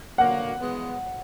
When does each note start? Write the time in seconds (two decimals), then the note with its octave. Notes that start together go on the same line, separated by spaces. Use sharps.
0.18 D3 F#3 A#3 F#5
0.61 E3 G#3 B3